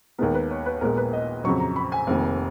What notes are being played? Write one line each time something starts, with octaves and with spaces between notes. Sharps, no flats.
D#2 D#3 G#3 B3 A#4
B4
C#5
B4
A#1 A#2 G#3 B3 A#4
B4
D#5
F2 C#3 F#3 C#6
A#5
B5
G#5
F1 F2 D#3 A#3